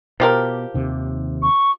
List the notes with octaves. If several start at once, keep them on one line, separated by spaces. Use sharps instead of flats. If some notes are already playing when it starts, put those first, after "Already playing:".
B2 F3 G4 A#4
D#2 C3 D#3
C#6